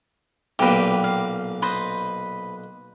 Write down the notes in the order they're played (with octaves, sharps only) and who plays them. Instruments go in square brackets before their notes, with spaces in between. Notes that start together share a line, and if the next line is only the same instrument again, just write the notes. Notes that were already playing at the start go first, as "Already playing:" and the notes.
[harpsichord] B1 A#2 [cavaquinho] G4 B4
[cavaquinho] F5
B4 C5 D#5